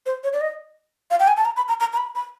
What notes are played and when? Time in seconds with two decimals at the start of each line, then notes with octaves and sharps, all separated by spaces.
0.06 C5
0.24 C#5
0.33 D5
0.41 D#5
1.11 F5
1.20 G5
1.28 G#5
1.37 A5
1.45 A#5
1.57 B5
1.68 A#5
1.80 A#5
1.93 A#5
1.98 B5
2.15 B5